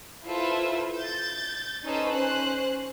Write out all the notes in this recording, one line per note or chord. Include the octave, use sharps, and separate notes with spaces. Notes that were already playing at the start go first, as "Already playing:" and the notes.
E4 F4 A4 B4 C5 E5
G6 A6
C#4 D#4 A4 B4 C5
C#4 C5 F#6